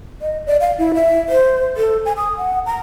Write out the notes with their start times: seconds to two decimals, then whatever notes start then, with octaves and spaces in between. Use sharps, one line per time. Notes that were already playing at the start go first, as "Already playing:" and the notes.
0.21 D#5
0.47 D5
0.60 F5
0.78 E4
0.94 E5
1.29 C5
1.77 A4
2.05 G#5
2.17 D#6
2.38 F#5
2.66 A#5